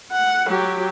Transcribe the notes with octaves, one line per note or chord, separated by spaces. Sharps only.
F#5
F#3 G4